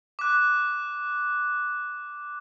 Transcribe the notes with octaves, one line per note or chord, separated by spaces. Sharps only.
D6 F#6